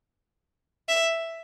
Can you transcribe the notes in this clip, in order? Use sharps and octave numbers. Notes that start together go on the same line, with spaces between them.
E5